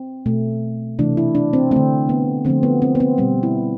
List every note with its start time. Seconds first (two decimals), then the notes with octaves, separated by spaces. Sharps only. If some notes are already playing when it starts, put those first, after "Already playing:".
Already playing: C4
0.26 B2 A3
0.99 C3 E3 A3 D4
1.17 E4
1.35 D4
1.53 C4
1.71 D3 A3 C4
2.09 B3
2.45 D3 F3 A3 C4
2.63 B3
2.82 C4
2.95 B3
3.00 C4
3.18 B2 G3 C4
3.43 E4